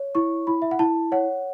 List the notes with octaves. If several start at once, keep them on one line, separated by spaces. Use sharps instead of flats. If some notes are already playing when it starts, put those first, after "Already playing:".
Already playing: C#5
E4 C#6
E4 B5
E5
F#5
E4 A5
C#5 F#5